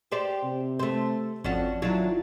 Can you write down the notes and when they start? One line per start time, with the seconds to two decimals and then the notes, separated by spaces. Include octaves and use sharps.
0.12 G4 C5 D5
0.43 C3
0.79 A3 C5
1.44 G#1 F2 C#4 D4 F#4
1.82 D#3 F#3 D4 E4 F4